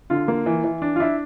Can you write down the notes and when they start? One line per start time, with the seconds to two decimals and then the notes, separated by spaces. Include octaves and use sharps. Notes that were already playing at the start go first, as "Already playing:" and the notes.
0.10 D3 F4
0.28 A#3
0.46 E3
0.64 E3
0.82 D4
0.96 F4
1.00 D4 E4